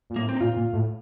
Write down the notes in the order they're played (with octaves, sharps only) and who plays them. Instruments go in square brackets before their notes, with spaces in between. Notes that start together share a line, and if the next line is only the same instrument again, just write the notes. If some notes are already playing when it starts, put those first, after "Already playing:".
[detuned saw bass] A#2
[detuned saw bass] A2 [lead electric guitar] A#3
[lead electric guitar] C4
D#4
[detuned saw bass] A#2 [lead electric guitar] F4
[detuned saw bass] A#2
A2